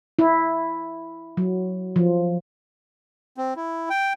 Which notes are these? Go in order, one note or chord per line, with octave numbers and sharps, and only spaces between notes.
E4
F#3
F3
C4
E4
G5